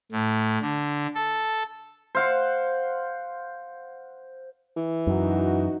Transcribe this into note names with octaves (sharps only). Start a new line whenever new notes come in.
A2
D3
A4
C5 F5 F#5
E3
F#2 D#4 F#4